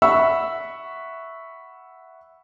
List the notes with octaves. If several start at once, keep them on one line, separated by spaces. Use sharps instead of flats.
E5 F#5 B5 C#6 E6